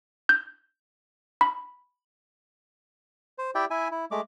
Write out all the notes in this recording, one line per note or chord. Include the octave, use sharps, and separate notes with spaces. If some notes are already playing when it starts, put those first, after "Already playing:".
G6
B5
C5
E4 G4 D5 E5 G5
E4 E5 G#5
E4
G#3 A3 D6